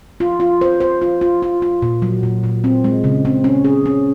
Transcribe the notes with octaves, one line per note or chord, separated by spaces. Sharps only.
F4
F4
C5
C5
F4
F4
F4
F4
A#2
F#3
A#2
A#2
C4
G#3
C#3
C4
C#4
G#4
C#4